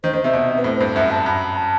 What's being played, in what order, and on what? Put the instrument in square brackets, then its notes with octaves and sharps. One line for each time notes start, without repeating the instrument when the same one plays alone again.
[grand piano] D#3 [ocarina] C5
[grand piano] D#3 [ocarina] C5
[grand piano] C3 [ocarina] E5
[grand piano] B2
[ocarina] B4
[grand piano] A2 [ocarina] C5
[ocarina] C5
[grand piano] G2
[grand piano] F#2 [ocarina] E5
[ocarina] A5
[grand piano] F#2 [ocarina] B5
[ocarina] A5